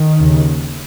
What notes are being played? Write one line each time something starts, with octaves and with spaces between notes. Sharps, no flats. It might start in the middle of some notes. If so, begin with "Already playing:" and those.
Already playing: D#3
D#2 C#3